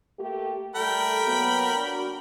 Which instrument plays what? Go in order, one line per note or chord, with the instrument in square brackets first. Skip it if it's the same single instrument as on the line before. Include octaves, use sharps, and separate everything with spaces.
[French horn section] A3 A#3 G4
[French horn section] G3 A3 A4 [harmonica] A#4 G5 B5
[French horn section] F#3 A#3 B3
A#3 D4 F#4